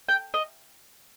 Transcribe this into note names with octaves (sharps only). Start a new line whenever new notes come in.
G5
D#5